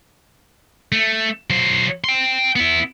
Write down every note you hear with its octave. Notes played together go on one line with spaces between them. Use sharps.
A3
F#3 C5
G5 C6
B3 E4